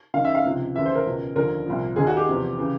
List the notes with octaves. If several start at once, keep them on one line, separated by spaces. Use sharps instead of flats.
F#2 D#3 F5
E5
F5
C#2 C3 F3
D#2 C#3 E3 E5
C5
A#4
C#2 B2
D#2 D3 F3 A#4
C2 A#2 F3
D#2 D#3 G#4
F#4
G4
E2 C3 F3
C#3 E3